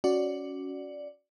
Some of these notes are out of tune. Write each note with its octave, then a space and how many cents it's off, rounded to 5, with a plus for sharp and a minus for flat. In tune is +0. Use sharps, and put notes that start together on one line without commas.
C#4 +10 F#4 +0 D5 +0